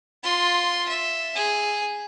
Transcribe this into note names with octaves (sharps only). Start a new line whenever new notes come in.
F4 C6
E5
G#4